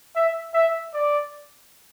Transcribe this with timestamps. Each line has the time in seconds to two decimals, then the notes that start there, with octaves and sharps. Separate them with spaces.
0.15 E5
0.54 E5
0.94 D5